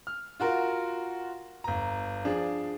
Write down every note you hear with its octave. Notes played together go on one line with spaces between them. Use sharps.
F6
F4 F#4 A#4
G1 A#5
F3 D4 G#4